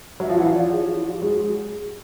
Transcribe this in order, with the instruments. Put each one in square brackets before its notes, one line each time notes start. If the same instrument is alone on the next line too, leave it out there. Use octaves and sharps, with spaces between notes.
[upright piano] F#3 [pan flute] E5
[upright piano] F3 [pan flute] F5
[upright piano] E3 [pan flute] F#5
[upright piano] F3 [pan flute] F5
[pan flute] D5
C#5
G#4
G4
F#4
E4
F#4
G4
[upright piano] F#3 G#3 [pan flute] G#4